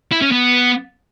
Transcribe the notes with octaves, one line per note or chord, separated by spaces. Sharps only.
E4
C#4
B3